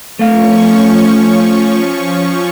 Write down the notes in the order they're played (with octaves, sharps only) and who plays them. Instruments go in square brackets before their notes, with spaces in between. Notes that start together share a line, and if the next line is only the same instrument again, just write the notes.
[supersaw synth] F3 C#4 C#6 [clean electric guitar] A3 F5